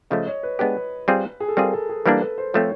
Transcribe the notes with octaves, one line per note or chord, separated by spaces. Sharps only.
C#3 F3 A3 D#5
C#5
B4
G#3 B3 D4 G4 B4
G3 C4 F4 G#4
G#4
A4
G3 C4 F4 G#4 A#4
A4
G#4
E3 G3 A#3 D4 A4
B4
C5
F3 A3 C4 C#5